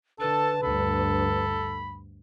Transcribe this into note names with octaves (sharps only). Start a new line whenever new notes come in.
D3 A4 B4 A5
D2 G2 A4 B5